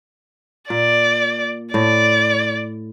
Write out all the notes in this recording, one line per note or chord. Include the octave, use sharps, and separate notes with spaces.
A#2 D5
A2 D5